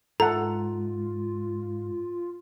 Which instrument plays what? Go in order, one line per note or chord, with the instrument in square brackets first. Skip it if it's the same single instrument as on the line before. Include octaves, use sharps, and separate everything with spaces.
[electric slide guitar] G#2 [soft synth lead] F4 [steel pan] A4 F#5 [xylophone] A#5